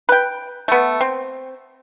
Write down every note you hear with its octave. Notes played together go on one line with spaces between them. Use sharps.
B4 G5
A3 B3
C4